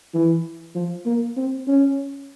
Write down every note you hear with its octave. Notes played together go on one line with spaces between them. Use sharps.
E3
F3
A#3
C4
C#4